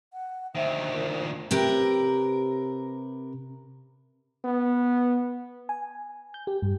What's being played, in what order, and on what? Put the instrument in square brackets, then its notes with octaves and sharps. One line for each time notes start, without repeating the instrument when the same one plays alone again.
[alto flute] F#5
[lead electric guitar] D2 D#3 [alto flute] C5 [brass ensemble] E5
[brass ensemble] A#2
[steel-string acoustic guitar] C3 G4 A#4 B4
[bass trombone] B3
[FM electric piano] G#5
G6
G4
G2